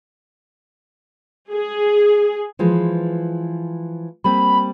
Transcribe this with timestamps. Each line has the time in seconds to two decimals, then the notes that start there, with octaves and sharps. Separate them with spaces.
1.51 G#4
2.59 E3 F3 G#3
4.24 G3 A#3 C4 B5